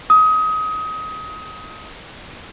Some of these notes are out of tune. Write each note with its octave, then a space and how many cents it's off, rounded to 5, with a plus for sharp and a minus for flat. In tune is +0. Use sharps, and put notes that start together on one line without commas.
D#6 +25